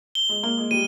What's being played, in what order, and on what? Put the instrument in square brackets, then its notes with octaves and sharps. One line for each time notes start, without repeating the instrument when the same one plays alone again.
[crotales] G7
[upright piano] G#3
[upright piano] A#3 [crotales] G7
[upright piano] G#3
[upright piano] G3 [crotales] D#7